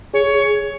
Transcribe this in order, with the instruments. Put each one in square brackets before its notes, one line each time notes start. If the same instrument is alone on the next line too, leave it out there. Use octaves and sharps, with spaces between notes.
[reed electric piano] G#4 [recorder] C#5